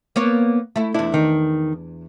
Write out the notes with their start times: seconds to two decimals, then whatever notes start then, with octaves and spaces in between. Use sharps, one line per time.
0.16 A#3 B3 C#5
0.76 A3 E4
0.94 E2 D4 E4
1.14 D#3